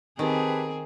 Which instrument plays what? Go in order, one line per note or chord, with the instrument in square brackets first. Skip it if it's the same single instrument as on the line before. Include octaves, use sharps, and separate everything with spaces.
[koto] D#3 [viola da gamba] C4 G#4 [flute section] G4 B4 A5